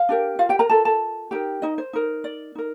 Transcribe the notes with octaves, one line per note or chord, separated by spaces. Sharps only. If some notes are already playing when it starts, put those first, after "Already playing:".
Already playing: F5
D4 G4 A#4
F4 F5
G4 G5
A#4 A#5
F4 A4 A#4 A5
A4 A5
D#4 G4 A#4 G5
D#4 D#5
C5
D#4 A#4
D5
D#4 A#4